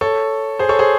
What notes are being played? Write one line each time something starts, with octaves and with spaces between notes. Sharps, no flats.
A4 C#5
G#4 C5
A4 C#5
G#4 C5